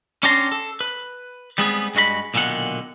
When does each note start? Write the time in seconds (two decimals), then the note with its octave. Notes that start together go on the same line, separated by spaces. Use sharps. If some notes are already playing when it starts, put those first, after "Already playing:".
0.23 C#4 D4 G4 A5 A#5 C6
0.52 A4
0.81 B4
1.58 G3 G#3 B3 C4 F#4 G#4
1.95 G2 G#3 F#4 E5 B5
2.34 B1 A#2 D3 D#3 F#5